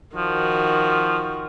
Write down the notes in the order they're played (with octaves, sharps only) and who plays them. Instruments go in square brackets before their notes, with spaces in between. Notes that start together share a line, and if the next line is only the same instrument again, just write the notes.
[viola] D#3 F#4 [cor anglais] F3